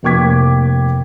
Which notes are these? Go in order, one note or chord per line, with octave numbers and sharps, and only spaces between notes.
F1 A#3 G5 D6 G#6 B6